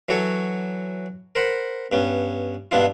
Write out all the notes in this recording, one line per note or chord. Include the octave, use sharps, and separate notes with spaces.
E3 F#3 F#4 A4 C#5
A#4 C5 F#5 B5
G2 B3 C#4
G2 B2 B3 D4 E4 F4